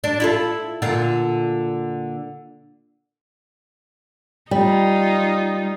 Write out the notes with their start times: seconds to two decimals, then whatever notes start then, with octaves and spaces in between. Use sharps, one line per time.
0.04 D4
0.20 E4 F4 A4
0.82 A#2 D3 F4
4.51 G3 D#4 F4